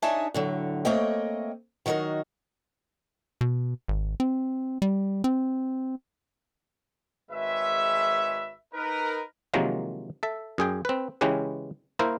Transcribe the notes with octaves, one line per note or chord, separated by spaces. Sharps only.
D4 D#4 G#4 C#5 E5 A5
A2 D3 F#3
A3 A#3 C4 C#5 D#5 G5
D#3 F#3 D#4 F#4 A#4
B2
G#1
C4
G3
C4
G#1 G#3 B4 C#5 E5
D#4 A#4 B4
C3 D#3 F3 F#3 G#3 A#3
A4 E5
F#2 G#4 G5
C4 B4
C#3 E3 G#3 C#4 G4 B4
A#3 E4 A#4 C5